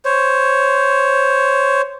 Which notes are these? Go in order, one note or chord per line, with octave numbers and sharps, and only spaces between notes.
C5 C#5